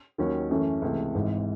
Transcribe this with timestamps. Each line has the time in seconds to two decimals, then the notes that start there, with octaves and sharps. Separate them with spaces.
0.18 D#2 D#3 F#3 C#4
0.50 F#2 E3 A3 C#4
0.82 C#2 C3 E3 A3
1.14 G#1 G#2 E3